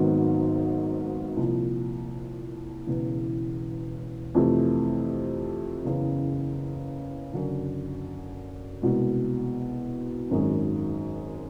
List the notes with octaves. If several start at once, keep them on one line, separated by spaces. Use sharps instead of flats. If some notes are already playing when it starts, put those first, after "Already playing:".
Already playing: G#1 G#2 D#3 F#3 B3
C2 A#2 F3
E1 E2 C#3 E3
F2 C3 E3 A3
F#1 E2 C#3
F#1 F#2 D3
C2 B2 G#3
G#1 F#2 D#3 G#3